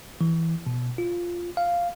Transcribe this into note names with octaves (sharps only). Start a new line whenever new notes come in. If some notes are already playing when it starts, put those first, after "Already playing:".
E3
B2
F4
F5